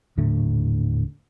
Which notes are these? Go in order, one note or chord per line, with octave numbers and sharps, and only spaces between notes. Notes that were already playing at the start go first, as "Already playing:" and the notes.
D#1 A2 D3 A3